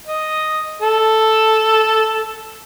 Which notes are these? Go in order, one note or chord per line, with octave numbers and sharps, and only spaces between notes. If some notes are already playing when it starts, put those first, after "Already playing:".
D#5
A4